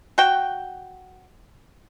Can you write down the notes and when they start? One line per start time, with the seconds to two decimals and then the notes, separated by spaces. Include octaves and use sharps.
0.18 F#4 G5